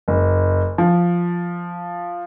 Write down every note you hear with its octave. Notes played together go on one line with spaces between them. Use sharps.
F#1
F3